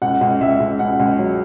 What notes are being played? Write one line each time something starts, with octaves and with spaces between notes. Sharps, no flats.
C#2 F#5
C#2
C#2 E5
C#2
C#2 F#5
C#2
F#3